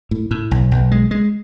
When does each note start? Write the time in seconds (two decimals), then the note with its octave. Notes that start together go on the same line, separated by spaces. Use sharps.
0.11 A2
0.31 A2
0.51 B1
0.71 B1
0.91 G#3
1.11 G#3